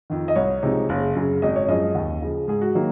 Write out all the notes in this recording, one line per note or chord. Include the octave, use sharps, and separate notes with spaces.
F2 D#3
D#5
C2 C#5
C3 F3 G#3 D#4
F#1
F#2 C#3
G#1 D#5
C#5
F#2 F3 G#3 D#5
D#2
C#3 F3
G#2 G#4
F#4
D#3 F#3 A#3